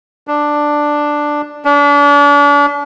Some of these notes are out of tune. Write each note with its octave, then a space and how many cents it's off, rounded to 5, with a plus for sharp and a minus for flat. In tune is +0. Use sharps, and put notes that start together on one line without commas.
D4 +5
D4 -35